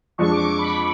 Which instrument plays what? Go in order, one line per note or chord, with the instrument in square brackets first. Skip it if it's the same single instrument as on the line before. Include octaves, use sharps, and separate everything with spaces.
[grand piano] F2 F3 G#3 D4 [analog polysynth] C#6
[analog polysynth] D6
C#6
B5